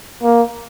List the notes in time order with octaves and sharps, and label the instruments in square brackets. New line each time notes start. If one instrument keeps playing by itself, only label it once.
[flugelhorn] A#3